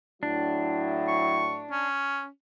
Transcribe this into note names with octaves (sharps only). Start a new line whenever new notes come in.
A2 F#3 D4 E4
C#6
C#4